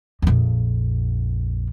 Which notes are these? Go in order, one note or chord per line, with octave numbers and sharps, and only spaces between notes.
A#1 F2